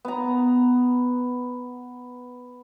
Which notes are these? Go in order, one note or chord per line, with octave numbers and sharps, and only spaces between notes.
B3 A#5